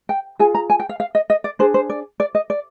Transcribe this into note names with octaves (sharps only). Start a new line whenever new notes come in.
G5
F4 G#4 G#5
A#5
G#5
G5
F5
F5
D#5
D#5
D5
D4 G#4 C5
C5
D5
D5
D#5
D5